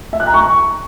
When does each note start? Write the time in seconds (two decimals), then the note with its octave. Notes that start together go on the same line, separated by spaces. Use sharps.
0.13 E5
0.20 F#6
0.27 A#5
0.34 C#6